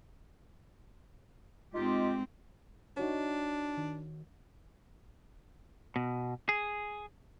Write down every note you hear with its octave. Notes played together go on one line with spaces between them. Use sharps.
G#2 C4 D#4 F4 G4
D4 D#4 F#4 C#5
D#3
B2
G#4